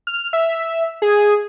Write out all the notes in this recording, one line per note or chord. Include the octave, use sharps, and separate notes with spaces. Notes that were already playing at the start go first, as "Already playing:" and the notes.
F6
E5
G#4